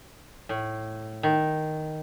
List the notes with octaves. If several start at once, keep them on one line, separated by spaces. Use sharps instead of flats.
A2
D#3